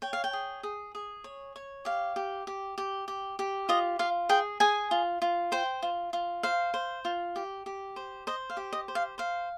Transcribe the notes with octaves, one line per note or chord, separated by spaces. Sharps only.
C#5 G5
F5
G5
G#4
G#4
G#4
C#5
C#5
G4 F5
G4
G4
G4
G4
G4
F4 D#5
F4 F5
G#4 G5
G#4 G#5
F4
F4
C5 G5
F4
F4
C5 F5
C5
F4
G4
G4
C5
C5 D#5
F5
G4
D#5
C5
F5
C5 F5